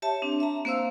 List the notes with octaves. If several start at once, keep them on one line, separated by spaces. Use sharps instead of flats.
G4 C#5 E5 A5
C4 D4
E5 A5 A#5
A#3 C4 C5 F5 E6